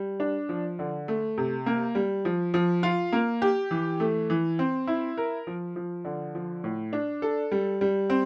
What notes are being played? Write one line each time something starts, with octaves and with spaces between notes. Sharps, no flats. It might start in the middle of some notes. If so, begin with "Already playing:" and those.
Already playing: G3
D4
F3
D3
A3
C3
A#3
G3
F3
F3
F4
A#3
G4
E3
A3
E3
C4
E4
A#4
F3
F3
D3
F3
A2
D4
A4
G3
G3
C4